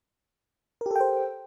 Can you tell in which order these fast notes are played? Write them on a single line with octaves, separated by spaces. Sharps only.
A#4 G4 A4 G5 C5